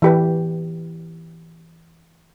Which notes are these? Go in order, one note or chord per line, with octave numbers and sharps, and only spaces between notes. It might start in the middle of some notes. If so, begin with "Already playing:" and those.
E3 G4 B4